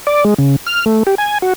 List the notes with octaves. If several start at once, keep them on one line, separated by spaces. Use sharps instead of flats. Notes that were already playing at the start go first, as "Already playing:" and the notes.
D5
G#3
C#3
F6
A3
G4
G#5
F#4